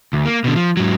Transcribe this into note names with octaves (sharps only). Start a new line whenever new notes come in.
D2
A#3
B2 D3
F3
G#2 F#3